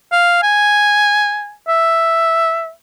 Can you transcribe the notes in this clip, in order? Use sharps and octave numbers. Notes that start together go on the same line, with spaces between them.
F5
G#5
E5